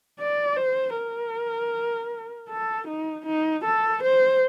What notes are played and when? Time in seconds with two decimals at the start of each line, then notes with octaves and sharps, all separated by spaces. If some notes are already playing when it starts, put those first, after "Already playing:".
0.19 D5
0.57 C5
0.95 A#4
2.49 A4
2.88 D#4
3.26 D#4
3.64 A4
4.03 C5